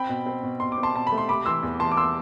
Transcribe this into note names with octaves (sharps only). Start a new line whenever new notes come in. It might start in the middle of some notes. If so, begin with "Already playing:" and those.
Already playing: C4 G5 B5
B2
C4
B2
B2 C6
D6
C4
A5 C6
B2 A5
B5
A3
C6
C3 B5 D6
E3 C6 E6
E2
E3 A5 C6
D6
C6 E6